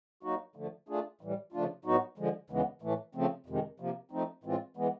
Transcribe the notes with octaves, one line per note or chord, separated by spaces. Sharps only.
F#3 A#3 D#4 F#4
D3 F3 A3
A3 D4 F4 G#4
A2 E3 G3
C#3 F3 A3 D4 F4
A2 F#3 B3 D#4 F#4
D3 F3 G#3
D#2 C#3 E3 G#3 B3
A2 E3 A3
C#3 F3 A3 C4
F2 C3 D#3 G#3
C3 F3 A#3
F3 A3 C4 D#4
A2 E3 G#3 C4 F4
E3 G#3 B3